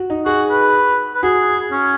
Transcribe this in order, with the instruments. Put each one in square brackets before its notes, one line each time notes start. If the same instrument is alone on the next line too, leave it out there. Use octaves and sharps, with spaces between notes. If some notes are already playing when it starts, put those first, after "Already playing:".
Already playing: [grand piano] F#4
D#4
[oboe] F#4 [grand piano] G#4
[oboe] B4
B4
[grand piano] F#4 [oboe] G#4
[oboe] C#4